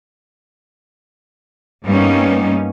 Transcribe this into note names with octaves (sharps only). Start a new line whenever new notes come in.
G2 G3 A#3 B3 C#4 D#4